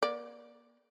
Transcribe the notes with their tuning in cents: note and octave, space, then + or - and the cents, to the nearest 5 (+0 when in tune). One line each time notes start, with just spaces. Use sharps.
A#3 +40 D5 +0